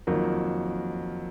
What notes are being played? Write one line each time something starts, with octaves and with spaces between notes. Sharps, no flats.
F2 D#3 F#3 A#3